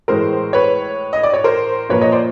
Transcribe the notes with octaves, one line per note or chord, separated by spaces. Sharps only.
A2 E3 G#3 A#4 C5
B4 C#5
D#5
D5
C#5
A#4 C5
A#2 F3 A#3 B4 C#5
C#5 D#5
C5 D5